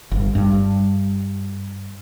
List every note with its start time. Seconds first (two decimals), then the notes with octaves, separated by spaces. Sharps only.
0.11 G1
0.35 G2